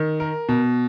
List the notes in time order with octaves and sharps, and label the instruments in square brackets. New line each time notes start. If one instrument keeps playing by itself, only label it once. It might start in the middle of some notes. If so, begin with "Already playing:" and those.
Already playing: [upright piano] D#3
A#4
B2